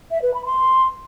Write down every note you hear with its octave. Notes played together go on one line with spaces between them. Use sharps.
E5
B4
B5
C6